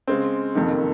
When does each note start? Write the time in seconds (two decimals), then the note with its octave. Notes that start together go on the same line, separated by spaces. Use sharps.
0.08 C#3 G#3 C4
0.55 F#1 F2 C3 D#3